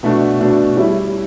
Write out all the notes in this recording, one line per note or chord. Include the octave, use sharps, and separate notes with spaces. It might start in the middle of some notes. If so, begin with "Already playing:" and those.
B2 A3 D4 F#4
B2 A3 D4 F#4
G3 C#4 E4